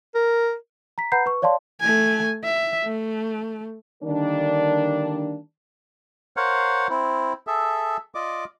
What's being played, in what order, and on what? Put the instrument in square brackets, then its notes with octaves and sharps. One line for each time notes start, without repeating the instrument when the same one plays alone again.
[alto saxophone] A#4
[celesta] A#5 B6
B4 F#5 A#5 B5 G6 C7
B4 C#6
C#5 D5 F5 A5 C6
[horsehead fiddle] A3 G#5
E5
A3
[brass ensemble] D3 D#3 G3 A#3 D4
[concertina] A#4 C5 C#5 F5 F#5
C4 E4
G#4 A4 E5
F4 D5 D#5 D6